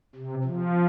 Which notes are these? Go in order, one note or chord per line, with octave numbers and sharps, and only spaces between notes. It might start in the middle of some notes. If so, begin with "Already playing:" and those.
C3
F3